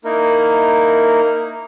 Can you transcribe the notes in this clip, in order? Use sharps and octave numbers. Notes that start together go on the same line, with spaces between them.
A#3 D#4 E4 A#4